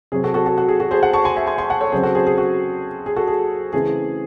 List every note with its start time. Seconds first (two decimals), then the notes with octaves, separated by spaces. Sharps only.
0.12 C3 F#3 C4 G#4
0.24 F#4 A4
0.34 F#4 A4
0.46 F#4 A4
0.58 F#4
0.68 G#4
0.80 F#4 A4
0.91 G#4 C5
1.03 F#5 A5
1.13 A5 C#6
1.25 G#5 C6
1.36 E5 G#5
1.47 G#5 C6
1.58 G#5 C6
1.70 F#5 A5
1.81 A4 C#5
1.92 C#3 F#3 C4 G#4 C5
2.03 F#4 A4
2.15 G#4 C5
2.27 G#4
2.38 F#4
3.06 G#4
3.16 F#4 A4
3.28 G#4
3.73 C#3 E3 A3 C4 G#4